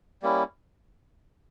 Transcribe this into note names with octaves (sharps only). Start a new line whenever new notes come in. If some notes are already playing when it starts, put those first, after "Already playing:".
G3 A#3 C#4 E4